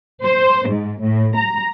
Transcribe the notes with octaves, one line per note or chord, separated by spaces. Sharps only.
C5
G#2
A2
A#5